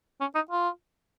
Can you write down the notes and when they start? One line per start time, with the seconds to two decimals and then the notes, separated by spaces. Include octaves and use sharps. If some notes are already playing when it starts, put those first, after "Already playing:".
0.20 C#4
0.35 D#4
0.51 F4